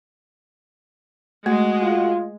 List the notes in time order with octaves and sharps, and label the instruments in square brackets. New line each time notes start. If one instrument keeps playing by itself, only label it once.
[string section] G#3 [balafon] A3 [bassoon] F#4
[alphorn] F4